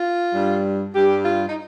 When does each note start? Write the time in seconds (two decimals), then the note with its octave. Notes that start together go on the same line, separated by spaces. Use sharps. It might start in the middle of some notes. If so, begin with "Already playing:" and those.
Already playing: F4
0.34 G2 G3
0.94 G2 G3 G4
1.25 F4
1.49 D#4